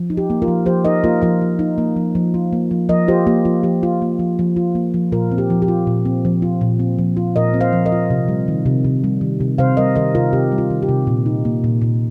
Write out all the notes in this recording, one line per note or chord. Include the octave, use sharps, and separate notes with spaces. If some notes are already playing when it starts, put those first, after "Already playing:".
Already playing: F3
D#4
G4
A#3
F4 A#4
F3
F3 G4 C5
D#4 A#4 D#5
A#3 F4 A#4
F3 F4 A#4
F3
D#4
A#3
F3
F3
F4
A#3
F3
F3 A#4 D#5
F4 G4 C5
A#3 G4
F3 F4
F3 G4
F4
A#3
F3
F3
F4
A#3
F3
A#2 F4 A#4
C4
G4
F3
G4
F4
A#2
C4
F3
F4
A#2
C4
F3
F4
A#2 A#4 D#5
C4
C5 F5
F3
A#4 D#5
F4
C3
G3
D#3
C3
C3
G3
D#3
C3
C3 C5 F5
G3 A#4 D#5
D#3 A#4 D#5
C3 F4 A#4
C3 G4
G3
F4
D#3
G4
C3
A#2
D#4
A#3
A#2
A#2